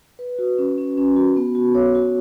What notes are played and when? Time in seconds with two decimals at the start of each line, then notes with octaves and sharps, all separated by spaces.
0.19 B4
0.39 F#4
0.58 C#4
0.78 C#4
0.98 C#4
1.16 F#4
1.36 B3
1.55 F#4
1.75 C#5
1.95 F#4